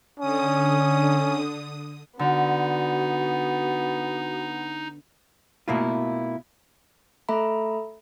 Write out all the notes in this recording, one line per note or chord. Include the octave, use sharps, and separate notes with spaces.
D3 C#4 D#6
D3 B3 D#4 F#4
B2 A3 A#3 E4 F4
A3 A4 E5 A#5 B5